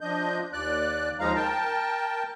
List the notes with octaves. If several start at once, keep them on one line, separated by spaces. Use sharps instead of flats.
F3 D4 D#5 G6
D#2 D5 F#6
D#2 F3 G#3 D#4 F5 A#5
A#4 G5 A5